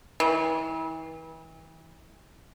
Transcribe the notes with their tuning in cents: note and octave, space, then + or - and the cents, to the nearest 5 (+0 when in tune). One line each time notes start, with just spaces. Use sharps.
E3 -35